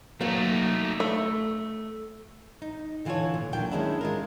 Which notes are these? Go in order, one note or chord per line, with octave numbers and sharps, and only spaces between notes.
F#3 A3 A#3 D#4
A3
D#4
D3 E3 F4 G4 A4 C#5
A#2
D#2 F#3 A#3 D4 G5
D#3 E3 G#3 C#4 D4 E4
G#3 F4 A#4